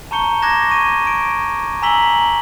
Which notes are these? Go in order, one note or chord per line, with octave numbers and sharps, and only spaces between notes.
A5 A#5 C#6 G6 C#7 G7
D6 F#6 G#6 A#6 E7
C#6 D#7
D7
G#5 A#5 E6 B6 F#7 G7